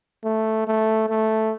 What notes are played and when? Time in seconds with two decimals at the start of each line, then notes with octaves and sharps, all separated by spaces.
0.24 A3
0.67 A3
1.10 A3